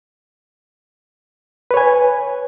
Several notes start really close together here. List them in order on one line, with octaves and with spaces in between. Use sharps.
B4 C#5 G#5